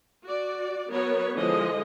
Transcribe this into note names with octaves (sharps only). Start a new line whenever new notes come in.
F#4 D5
F#3 B3 A#4 C#5
D3 E3 F3 G#3 D#5